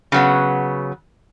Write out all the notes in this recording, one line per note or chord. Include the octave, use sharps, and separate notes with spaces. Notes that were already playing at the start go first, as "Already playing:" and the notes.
C#3 F#3 B3